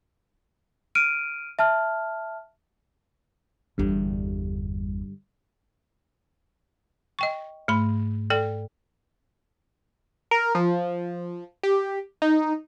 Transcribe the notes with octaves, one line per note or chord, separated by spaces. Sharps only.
F6 D7 D#7
E5 A5 F6
G1 E2 G2 D3 G3
D#5 G5 C#6
G#2 A3 B5
A4 D5 G5
A#4
F3
G4
D#4